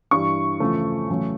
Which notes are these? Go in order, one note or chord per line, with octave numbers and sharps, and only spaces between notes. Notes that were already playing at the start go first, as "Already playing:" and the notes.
G2 E3 G3 C#6
E2 C#3 F3 A3
E2 C#3 F#3 A3